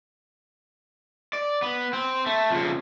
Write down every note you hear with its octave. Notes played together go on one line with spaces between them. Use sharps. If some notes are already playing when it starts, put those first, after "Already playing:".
D5
B3
C4
A3
F2 C#3